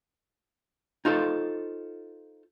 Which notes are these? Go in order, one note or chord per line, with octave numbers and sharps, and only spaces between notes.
D#4 F4 A4 C5